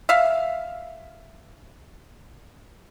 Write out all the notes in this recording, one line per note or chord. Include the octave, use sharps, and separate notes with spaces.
E5 F5